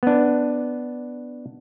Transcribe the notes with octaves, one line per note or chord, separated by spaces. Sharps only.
B3 D4